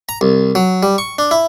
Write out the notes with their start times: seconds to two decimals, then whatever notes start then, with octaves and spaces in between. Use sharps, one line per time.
0.09 A#5
0.21 C2
0.55 F#3
0.83 G3
0.98 C#6
1.19 D4
1.31 E4